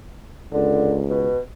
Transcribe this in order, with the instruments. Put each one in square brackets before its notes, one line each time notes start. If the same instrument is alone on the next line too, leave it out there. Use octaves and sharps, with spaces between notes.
[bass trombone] C#2 [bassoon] D3
[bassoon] B2